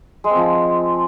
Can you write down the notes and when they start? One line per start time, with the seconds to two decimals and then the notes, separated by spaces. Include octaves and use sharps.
0.24 G#3
0.30 C4
0.36 F3